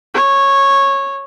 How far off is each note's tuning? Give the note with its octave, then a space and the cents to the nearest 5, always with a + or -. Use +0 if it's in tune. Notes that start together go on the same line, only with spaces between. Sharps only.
C#5 -10